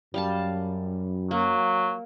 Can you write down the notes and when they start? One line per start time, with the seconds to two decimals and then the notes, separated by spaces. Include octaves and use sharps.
0.14 F#2 G3 F5 A5
1.31 F#3 A#3